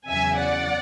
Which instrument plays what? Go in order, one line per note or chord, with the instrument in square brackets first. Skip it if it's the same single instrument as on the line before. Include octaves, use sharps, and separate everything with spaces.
[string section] E2 C#3 F#3 E5 G#5
D5 F#5